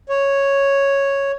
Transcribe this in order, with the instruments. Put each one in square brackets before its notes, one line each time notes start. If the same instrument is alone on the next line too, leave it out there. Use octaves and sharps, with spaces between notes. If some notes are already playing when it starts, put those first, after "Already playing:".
[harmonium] C#5